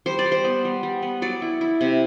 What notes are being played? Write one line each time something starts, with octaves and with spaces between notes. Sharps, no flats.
G3 C5
D5
G3
C5
B3
G3
G3
B3
F#3 D5
E4
E4
C3